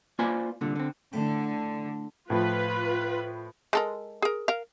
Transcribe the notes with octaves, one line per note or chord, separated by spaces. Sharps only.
A#3 F4 B4 C5 D5 G#5
C2 A#2 D3
D3 C4
A2 D3 A3 G5
A2 F3 F4 B4
G#3 A4 A#4
G#4 A#4
A#4 F5